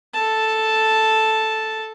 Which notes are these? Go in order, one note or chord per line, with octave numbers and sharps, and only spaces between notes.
A4 A5